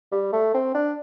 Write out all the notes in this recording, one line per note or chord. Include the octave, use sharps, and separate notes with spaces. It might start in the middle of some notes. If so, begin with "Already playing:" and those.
G3
A3
C4
D4